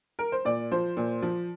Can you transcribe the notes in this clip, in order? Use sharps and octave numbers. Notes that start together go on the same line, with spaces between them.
A#4
C5
A#2 D5
F3 C5
A#2
F3